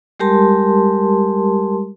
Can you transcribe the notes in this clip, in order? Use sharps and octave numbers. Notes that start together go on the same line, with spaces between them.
G3 G#3 G4 A#4 A5 C6